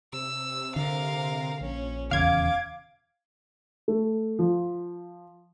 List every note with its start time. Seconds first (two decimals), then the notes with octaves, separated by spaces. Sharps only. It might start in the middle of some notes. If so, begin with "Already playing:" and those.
0.13 C3 E6
0.76 D3 A#4 F5
1.61 A#1 C#4
2.11 D#1 E2 C#3 F5 D6 G#6
3.88 A3
4.39 F3